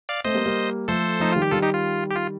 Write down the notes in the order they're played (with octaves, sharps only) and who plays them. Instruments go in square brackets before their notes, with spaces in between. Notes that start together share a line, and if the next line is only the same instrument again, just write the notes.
[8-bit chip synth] D5 F5
[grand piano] A3 C4 [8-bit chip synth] C5 D#5
[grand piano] G3 A#3
G3 A#3
[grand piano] F3 A3 [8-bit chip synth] A4 C5
[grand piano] F3 A3 [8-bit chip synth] D#4
[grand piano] D#3 G3 [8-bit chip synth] F4
[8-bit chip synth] G4
[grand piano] D#3 G3 [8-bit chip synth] F4 A4
[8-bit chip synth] D#4 G4
F4
G4
F4